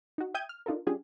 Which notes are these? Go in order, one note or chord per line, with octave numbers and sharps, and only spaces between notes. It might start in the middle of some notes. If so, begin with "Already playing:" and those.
D#4 F#4
E5 G5 D#6 G6 G#6 D#7
F6
D4 D#4 F4 A4 A#4
F#3 C#4 D4 F4 G4 G#4